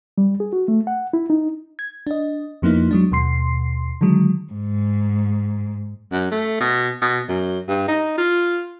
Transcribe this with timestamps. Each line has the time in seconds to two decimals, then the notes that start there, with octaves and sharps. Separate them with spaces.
0.18 G3
0.40 G#4
0.53 F#4
0.68 A3
0.87 F#5
1.13 E4
1.30 D#4
1.79 G#6
2.07 D4 D#5
2.62 F2 F3 A#3 B3 D#4 E4
2.91 F#3 G#3 D4
3.12 D#2 B2 C6 C7
4.01 D3 D#3 F#3 G#3
4.53 G#2
6.12 F#2
6.31 A3
6.60 B2
7.02 B2
7.28 F#2
7.68 G2
7.88 D#4
8.18 F4